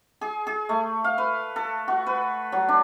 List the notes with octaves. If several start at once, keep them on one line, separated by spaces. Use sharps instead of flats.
G#4
G#4
A3
F5
B4
A4
F#4
B4
F#3
D4